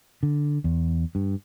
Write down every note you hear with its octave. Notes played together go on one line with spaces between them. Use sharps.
D3
E2
G2